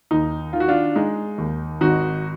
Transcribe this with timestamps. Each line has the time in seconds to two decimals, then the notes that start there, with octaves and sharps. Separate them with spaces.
0.11 D#2 D#4
0.53 D#3 F4
0.60 F#4
0.68 D4 F4
0.96 G#3 D#4
1.38 D#2
1.81 G#1 D#4 F#4